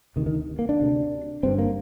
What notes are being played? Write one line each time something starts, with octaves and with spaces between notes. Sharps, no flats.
D2 C3 D#3
D#3
A#3
D4
D2 C3
G1 G2 D3 C4
A#3